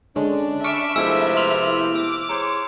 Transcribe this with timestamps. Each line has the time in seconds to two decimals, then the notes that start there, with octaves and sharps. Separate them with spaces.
0.16 D3 G#3 C#4 D4
0.64 E5 B5 C#6 D6 F6 D7 E7
0.96 C3 F3 G#3 A3 B3 E4 E6
1.37 C6 F6 F7
1.96 D6 E6
2.29 G#4 C5 C#5 A#5